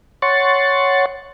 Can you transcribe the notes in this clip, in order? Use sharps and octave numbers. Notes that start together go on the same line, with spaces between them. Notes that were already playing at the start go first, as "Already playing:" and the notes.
C#5 F#5 C6 C#6 A6